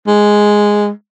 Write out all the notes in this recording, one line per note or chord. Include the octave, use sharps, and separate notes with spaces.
G#3